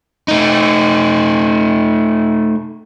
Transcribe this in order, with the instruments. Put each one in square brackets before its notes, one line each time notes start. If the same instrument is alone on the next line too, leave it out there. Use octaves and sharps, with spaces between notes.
[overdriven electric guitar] A3 D#4